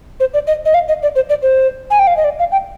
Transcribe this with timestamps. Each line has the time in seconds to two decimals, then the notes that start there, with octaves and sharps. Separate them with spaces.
0.20 C5
0.34 D5
0.47 D#5
0.65 D#5
0.74 F5
0.88 D#5
1.03 D5
1.15 C5
1.29 D5
1.43 C5
1.90 G#5
1.99 G5
2.07 F5
2.17 D#5
2.24 D5
2.39 F5
2.52 G5